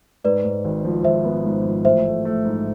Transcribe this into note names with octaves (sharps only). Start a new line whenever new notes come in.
G#2 B4 D5
G#2
G#1
F3
G#1 C5 E5
B3
G#2
F3
A1 C5 E5
A3
A3
G#2